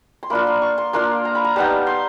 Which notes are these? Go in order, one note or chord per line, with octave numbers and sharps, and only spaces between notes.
C6
A#3 D4 F4 B5
C6
C#6
C6
A#3 D4 F4 C6
A#5
B5
A#5
G3 B3 D#4 A5
C6